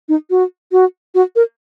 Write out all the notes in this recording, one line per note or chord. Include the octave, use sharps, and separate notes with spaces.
D#4
F#4
F#4
F#4
A#4